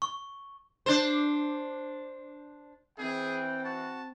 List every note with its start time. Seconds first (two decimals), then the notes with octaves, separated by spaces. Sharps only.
0.02 C#6
0.86 D4 C5
2.98 E3 C4 G#4 G5
3.64 F#4 A5